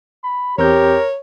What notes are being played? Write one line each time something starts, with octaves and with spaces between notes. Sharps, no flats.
B5
E2 C4 G4 A#4 C#5 G6